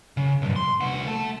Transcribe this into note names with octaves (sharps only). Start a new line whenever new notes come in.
C#3
B1 G2
C6
C2 F#4
A3 A4